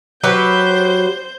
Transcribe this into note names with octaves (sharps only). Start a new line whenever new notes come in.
F#3 G4 B4 C5 G6